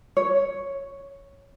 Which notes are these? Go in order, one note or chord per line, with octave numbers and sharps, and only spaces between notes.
C#5